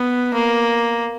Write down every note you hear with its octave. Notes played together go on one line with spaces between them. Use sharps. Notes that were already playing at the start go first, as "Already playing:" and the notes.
Already playing: B3
A#3